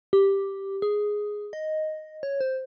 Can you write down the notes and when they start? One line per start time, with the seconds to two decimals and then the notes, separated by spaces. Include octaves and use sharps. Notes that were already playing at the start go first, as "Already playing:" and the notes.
0.13 G4
0.82 G#4
1.53 D#5
2.23 C#5
2.41 C5